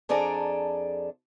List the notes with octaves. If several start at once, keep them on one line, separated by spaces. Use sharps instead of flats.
F2 D4 G#4 A4 D5 A#5